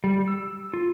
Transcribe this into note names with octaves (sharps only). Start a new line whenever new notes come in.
G3
E6
F4